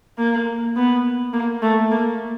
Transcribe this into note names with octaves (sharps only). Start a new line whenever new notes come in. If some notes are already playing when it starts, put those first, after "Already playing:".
A#3
B3
A#3
A3
A#3